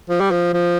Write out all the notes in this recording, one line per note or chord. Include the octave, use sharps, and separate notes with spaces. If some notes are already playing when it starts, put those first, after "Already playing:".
F3
G3
F3
F3